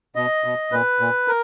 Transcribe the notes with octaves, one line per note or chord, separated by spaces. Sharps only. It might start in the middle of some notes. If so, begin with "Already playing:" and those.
B2 D#5
B2
A#2 B4
A#2
A#4